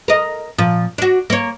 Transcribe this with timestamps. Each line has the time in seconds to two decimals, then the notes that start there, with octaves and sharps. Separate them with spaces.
0.08 A#4 D#5
0.58 A#2 F3
0.98 D4 F#4
1.30 A#3 C#5